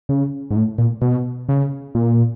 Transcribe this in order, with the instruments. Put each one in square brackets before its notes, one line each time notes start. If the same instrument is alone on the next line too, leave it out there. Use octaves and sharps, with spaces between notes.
[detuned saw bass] C#3
G#2
A2
A#2
B2
C#3
A#2